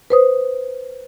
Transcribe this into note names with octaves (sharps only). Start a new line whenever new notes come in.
B4 C5 D#6